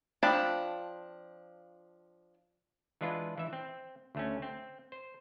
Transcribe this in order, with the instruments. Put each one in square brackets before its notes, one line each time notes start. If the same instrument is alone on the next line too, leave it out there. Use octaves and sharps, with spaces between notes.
[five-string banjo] F3 C4 D4 A5 B5
[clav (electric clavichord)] E3 G#3 D4 F4 B4
E3 E5
C4
D2 A3 C#4
C4
C5